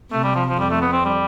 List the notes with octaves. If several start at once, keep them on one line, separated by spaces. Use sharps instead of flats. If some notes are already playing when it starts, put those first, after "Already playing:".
C3 A3
G3
F3
F3
F2 G3
A3
B3
C4
G3